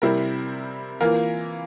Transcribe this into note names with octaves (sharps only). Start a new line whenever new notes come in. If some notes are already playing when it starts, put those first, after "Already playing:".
C3 G3 C4 E4 A#4
E3 A#3 F4 A#4